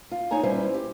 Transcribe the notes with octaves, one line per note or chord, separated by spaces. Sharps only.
F4
D#4 C#5 G#5 A#5
G3 C#4 E4 B4 C5
G4